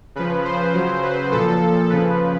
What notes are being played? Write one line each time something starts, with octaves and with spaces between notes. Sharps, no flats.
C#3 F3 B4
C5
C#3 F#3
B4
A#2 F3 A4
C#3 F3 B4